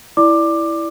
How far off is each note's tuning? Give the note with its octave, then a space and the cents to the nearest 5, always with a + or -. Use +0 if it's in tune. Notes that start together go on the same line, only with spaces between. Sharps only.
E4 +0 D5 +0 D6 +15